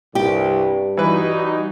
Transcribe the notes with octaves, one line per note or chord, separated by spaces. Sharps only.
C2 G2 G4
E3 G3 D#4 F#4 B4